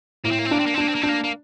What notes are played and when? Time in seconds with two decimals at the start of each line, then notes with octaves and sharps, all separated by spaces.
0.24 A2 A#3
0.32 C4
0.39 A#3
0.46 C4
0.51 A#3 D4
0.60 C4
0.67 A#3
0.74 C4
0.78 A#3 D4
0.87 C4
0.95 A#3
1.02 C4 D4
1.09 A#3
1.24 A#3